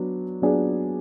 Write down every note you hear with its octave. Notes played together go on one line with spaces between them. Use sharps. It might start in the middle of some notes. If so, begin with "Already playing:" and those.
Already playing: F#3 B3 D4
F#3 B3 D4 G#4 D5